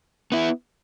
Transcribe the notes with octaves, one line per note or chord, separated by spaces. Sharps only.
B3 E4